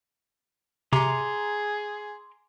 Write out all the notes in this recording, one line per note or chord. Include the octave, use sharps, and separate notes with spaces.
C3 G#4 A#5 C6 D6